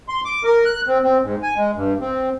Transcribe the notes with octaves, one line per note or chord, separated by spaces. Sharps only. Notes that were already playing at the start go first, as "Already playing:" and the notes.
C6
D6
A#4
F#6
C4
C4
G#2
G#5
G#3
G2
C4